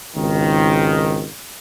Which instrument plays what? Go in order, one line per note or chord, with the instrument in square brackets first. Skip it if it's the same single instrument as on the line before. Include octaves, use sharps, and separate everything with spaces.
[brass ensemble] G#1 C#2 D#3